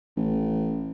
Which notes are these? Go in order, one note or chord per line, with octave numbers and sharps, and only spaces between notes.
A1